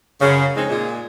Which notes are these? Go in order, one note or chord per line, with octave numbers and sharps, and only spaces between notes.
F#2 C#3
F2 G#3 C4 C#4 D#4
A#2 G#3